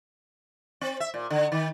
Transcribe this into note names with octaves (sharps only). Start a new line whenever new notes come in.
C4
E5
A#2
D3
D#3